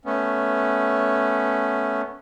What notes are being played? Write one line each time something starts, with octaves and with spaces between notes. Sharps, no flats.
A3 B3 C#4